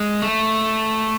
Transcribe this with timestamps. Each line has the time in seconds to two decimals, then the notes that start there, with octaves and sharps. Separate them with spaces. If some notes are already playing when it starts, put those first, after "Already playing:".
Already playing: G#3
0.22 A3